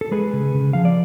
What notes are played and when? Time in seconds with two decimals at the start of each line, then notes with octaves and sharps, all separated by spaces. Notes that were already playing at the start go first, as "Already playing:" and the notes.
0.01 A4
0.11 G#3 G#4 B4
0.33 C#3
0.55 C#3
0.73 F3 F5
0.85 D5